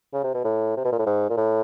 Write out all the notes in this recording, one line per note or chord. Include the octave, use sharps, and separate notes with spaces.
C#3
C3
B2
A2
C3
B2
A#2
A2
G#2
A#2
A2